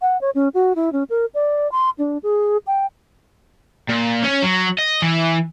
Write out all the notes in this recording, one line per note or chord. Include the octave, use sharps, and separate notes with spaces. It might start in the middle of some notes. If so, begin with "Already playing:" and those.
F#5
C#5
C#4
F#4
E4
C#4
A#4
D5
C6
D4
G#4
G5
A#2
C#4
F#3
D#5
E3